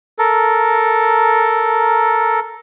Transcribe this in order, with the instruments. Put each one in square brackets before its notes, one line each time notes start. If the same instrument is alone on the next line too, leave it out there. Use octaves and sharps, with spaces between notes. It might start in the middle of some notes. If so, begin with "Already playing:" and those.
[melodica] A4 A#4